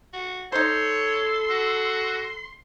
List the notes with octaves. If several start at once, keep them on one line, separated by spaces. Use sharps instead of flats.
F#4
D#4 A4 C5 C#5 C6
F#4